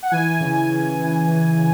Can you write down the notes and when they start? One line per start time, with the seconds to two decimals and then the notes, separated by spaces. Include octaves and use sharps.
0.03 F#5
0.11 E3 G#5
0.40 C#3
0.55 G#5
0.70 C#3
0.98 E3
1.27 E3
1.57 C#3